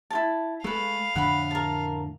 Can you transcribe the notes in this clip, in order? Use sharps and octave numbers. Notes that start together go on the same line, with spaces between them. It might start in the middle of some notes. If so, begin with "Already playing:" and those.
E4 F4 A5
G#3 A3 A4 B4 F5
F2 A2 D3 F#5 B5
A#4 A5